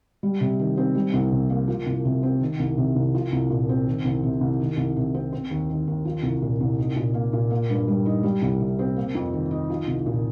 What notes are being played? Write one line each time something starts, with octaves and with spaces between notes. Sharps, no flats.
G3
C3
D#3
C4
G3
C2
C3
A#3
F3
C2
C3
C4
D#3
C2
C3
C2
F3
C2
A#2
C4
D#3
C2
C3
C2
D#3
C2
C3
C4
C4
D#2
D#3
D#2
F3
C2
A#2
C2
D#4
A#2
A#3
A#2
A#3
G2
G3
D#4
G3
C2
C3
C4
A#3
F2
D#3
D#4
F3
C2
A#2